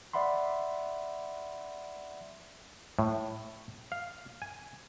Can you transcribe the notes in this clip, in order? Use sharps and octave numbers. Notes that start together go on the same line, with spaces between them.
D5 E5 F#5 B5 C6
A2
F5
G#5